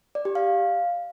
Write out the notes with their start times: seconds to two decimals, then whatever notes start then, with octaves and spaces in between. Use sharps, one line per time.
0.15 D5
0.25 G4
0.35 F5